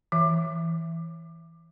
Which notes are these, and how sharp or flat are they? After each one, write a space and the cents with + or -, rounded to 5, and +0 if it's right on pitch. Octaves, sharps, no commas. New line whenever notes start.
E3 +0 E5 +0